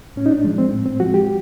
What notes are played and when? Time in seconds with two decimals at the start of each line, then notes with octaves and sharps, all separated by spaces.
0.16 A2 C#4
0.26 D#4
0.31 D4
0.44 F3 G#3
0.58 C4
0.73 A2
0.86 C4
1.00 F3 G#3 F#4
1.14 G4